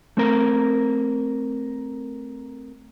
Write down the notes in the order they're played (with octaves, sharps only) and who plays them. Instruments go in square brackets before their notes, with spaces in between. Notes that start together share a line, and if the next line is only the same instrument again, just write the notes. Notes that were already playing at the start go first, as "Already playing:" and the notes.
[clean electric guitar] A3 C4 A#4